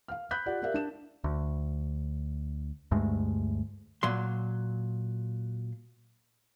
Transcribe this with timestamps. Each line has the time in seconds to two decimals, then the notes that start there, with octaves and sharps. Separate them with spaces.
0.08 F5 F6
0.31 B5 F#6 G6 B6
0.46 F4 G4 D5 F#5
0.63 G4 A#4 D5 E5 F5
0.74 D4 E7
1.24 D2
2.91 D2 G2 G#3 A3
4.03 A#2 F#3 C6